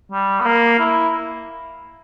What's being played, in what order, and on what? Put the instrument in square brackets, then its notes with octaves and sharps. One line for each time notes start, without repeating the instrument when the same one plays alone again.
[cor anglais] G3
B3
A#3
E4